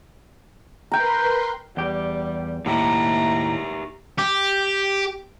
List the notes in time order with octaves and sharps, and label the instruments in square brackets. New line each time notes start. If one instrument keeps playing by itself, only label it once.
[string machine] A#4 B4 C6 [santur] G5 A#5
[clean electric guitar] E2 G4 [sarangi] G3
[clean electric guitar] D#2 A2 [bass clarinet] A#3 [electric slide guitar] D#4 G4 E5 [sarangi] A#5
[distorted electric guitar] G4